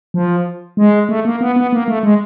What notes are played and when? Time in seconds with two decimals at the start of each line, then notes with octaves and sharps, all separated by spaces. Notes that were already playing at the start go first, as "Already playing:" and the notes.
0.14 F3
0.77 G#3
1.09 A3
1.25 A#3
1.41 B3
1.56 B3
1.73 A#3
1.88 A3
2.03 G#3